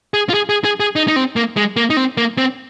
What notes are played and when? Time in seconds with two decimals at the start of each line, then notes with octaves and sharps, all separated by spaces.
0.14 G#4
0.29 F4
0.34 G#4
0.49 G#4
0.65 G#4
0.80 G#4
0.96 D#4
1.08 D#4
1.16 C4
1.36 A#3
1.57 G#3
1.76 A#3
1.90 D#4
1.97 C4
2.17 A#3
2.38 C4